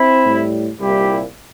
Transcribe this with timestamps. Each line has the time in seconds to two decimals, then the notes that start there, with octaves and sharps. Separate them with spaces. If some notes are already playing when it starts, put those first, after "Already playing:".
Already playing: C4 E4
0.25 A2 G3
0.79 C2 A#2 G3 E4 G4